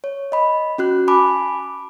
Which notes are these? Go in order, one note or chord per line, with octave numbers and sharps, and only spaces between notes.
C#5
D#5 B5
C#4 F#4 F#6
G#5 A5 B5 D6